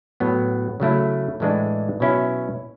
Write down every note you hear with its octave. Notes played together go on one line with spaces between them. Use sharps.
A2 F#3 B3
C#3 F#3 A3 E4
A2 E3 G#3 D4
B2 F#3 C#4 E4